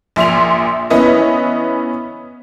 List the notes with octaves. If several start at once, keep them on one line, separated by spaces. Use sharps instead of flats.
A#1 A#2 E5 C6 F7
E3 B3 C#4 B4 D#5 E5